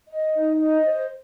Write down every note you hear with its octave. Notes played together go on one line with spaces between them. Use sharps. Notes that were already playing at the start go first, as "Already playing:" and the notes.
D#5
D#4
D#5
C5